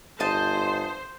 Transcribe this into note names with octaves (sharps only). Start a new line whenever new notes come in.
G1 C5 D#5 A5